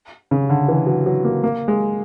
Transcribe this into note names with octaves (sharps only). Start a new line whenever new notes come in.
C#3
D3
E3
F#3
F#3
A#3
A#3
G#3